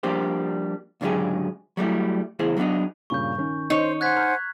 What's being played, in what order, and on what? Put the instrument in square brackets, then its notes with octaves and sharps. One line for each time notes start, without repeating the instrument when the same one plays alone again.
[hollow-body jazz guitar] F3 G3 A#3 D4 G4 C5
C#2 G#2 D3 F#3 G4 G#4
F#3 G3 A3 E4
E2 C#3 E4 G#4 C5
F#3 G3 B3 D4 D#4
[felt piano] G2 A#2 C#3 [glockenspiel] C#6 G6
[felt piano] D#3 C#4
[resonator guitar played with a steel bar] D#4 C#5 [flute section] C5
[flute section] C5 F#5 G#5 [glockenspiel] F#6 G#6 B6
[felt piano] A#5 F6 G6